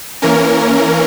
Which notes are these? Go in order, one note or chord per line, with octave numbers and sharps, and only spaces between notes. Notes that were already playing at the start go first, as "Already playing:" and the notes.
E3 A#3 C#4 A#4